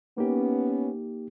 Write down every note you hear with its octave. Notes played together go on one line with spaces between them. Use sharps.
A#3 B3 C#4 D#4 G4